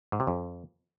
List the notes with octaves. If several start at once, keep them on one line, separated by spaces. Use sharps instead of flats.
G#2
C3
F2